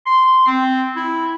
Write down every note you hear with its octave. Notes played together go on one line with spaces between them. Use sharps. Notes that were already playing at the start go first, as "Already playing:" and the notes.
C6
C4
E4